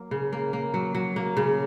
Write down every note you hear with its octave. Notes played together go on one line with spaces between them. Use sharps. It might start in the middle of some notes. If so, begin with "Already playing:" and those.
Already playing: F#3 A#3
C#3
A#3
A#3
F#3
F#3
A#3
C#3